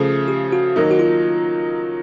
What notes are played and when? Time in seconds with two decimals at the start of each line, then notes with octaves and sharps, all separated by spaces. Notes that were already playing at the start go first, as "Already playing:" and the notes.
Already playing: C#3 F3 A3 G#4
0.28 G4
0.52 F#4
0.76 D#3 F#3 A#3 D#4
0.91 F#4
0.99 F4